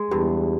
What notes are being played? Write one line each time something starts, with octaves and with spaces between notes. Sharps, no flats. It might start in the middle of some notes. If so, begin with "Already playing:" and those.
Already playing: G#3
E2 G2